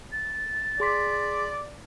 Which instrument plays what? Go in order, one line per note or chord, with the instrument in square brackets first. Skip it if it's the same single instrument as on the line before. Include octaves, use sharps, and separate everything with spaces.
[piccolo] A6
[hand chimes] G#4 C6 B6 [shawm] D5